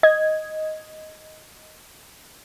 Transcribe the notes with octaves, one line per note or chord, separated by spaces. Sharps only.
D#5 G#6